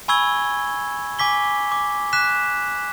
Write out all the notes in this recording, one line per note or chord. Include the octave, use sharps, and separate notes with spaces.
G#5 B5 C#6 E6 G#6 G7
G#5 D6 B6 G7
D6
D6 F#6 B6 E7